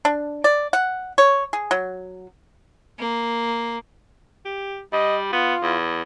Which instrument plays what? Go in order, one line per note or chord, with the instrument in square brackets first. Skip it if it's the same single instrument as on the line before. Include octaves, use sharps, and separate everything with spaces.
[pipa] D4
D5
F#5
C#5
G#4
F#3
[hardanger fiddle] A#3
[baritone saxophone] G4
[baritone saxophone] G3 [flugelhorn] D#5
[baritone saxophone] B3 [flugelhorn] F4
[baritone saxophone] E2